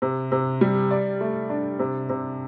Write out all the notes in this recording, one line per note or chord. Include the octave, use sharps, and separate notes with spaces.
C3
C3
G3
D5
A3
D4
C3
C3